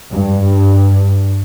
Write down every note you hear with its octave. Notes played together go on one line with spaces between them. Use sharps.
G2